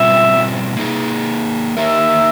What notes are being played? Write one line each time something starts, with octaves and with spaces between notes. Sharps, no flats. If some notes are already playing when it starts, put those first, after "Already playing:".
Already playing: B2 G3 C4 F4 E5
A#3 D#4 G#4
A#3 D#4 G4 A#4 E5